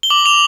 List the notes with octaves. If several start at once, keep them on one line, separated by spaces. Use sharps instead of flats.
G7
D6 F#7
D6 F7